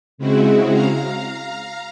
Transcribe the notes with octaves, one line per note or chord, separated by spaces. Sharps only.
C#3 G#3 C4 E4 F#4
F5 A#5